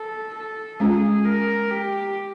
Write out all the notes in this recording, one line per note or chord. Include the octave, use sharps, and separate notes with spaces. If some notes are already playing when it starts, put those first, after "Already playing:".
Already playing: A4
A4
G#3 C#4 F4 G#4
A#4
G4